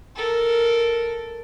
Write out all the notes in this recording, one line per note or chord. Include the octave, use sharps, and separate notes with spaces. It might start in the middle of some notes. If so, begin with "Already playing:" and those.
A4 A#4